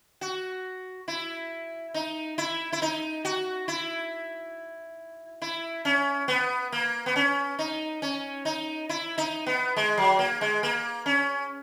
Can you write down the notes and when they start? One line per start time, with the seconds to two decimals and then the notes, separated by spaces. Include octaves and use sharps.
0.21 F#4
1.08 E4
1.94 D#4
2.38 E4
2.73 E4
2.82 D#4
3.25 F#4
3.68 E4
5.42 E4
5.85 C#4
6.28 B3
6.72 A#3
7.06 B3
7.16 C#4
7.59 D#4
8.02 C#4
8.45 D#4
8.89 E4
9.18 D#4
9.46 B3
9.77 G#3
9.98 F#3
10.19 A#3
10.41 G#3
10.63 A#3
11.06 C#4